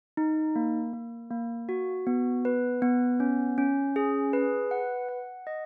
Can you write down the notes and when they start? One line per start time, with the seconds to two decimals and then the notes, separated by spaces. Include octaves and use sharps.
0.17 D#4
0.56 A#3
0.93 A#3
1.31 A#3
1.69 F#4
2.07 B3
2.45 B4
2.82 B3
3.20 C#4
3.58 C#4
3.96 G#4
4.33 B4
4.71 F#5
5.09 F#5
5.47 D#5